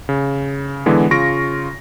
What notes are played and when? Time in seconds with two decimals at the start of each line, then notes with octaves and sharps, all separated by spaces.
0.09 C#3
0.86 D3 E3 G#3 B3
1.11 C#3 F4 C#6 A#6 D7